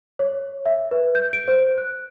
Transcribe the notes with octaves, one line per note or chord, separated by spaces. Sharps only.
C#5
E5
B4
G6
D7
C5
F#6